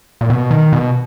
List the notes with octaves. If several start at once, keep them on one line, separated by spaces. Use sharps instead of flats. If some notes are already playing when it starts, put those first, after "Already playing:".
A#2
B2
D#3
B2